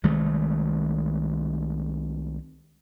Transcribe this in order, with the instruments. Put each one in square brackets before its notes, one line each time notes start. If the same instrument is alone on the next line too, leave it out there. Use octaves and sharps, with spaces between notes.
[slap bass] C2 D#3 G#3 A3